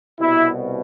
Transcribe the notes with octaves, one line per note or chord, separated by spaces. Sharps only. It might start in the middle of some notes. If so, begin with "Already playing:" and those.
C2 B2 E4